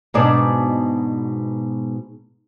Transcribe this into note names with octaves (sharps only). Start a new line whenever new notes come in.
G#2 B2 D4